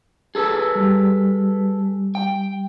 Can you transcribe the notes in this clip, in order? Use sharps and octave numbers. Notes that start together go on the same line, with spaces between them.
G#4 A4 B4
G3
G5